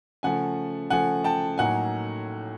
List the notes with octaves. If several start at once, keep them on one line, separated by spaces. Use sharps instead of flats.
C#3 F3 A3 F#5 G#5
C#3 F3 A3 F#5 G#5
G5 A5
A2 F#3 A#3 D#4 F#5 G#5